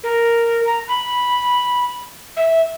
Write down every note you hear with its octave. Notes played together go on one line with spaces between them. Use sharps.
A#4
A#5
B5
E5